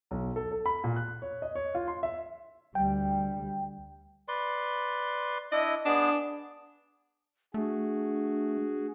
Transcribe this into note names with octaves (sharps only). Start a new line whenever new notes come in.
B1
A4
A4
B5
A#2
F#6
C#5
D#5
C#5
F4
C6
E5
D2 G3 G5
B4 D5 C6
D4 E4 D#5
B3 D4 G#4
A3 D4 F#4 G#4